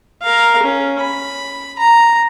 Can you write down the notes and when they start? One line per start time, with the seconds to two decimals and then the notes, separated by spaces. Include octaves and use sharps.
0.22 A#4 F5
0.63 C#4
1.00 B5
1.79 A#5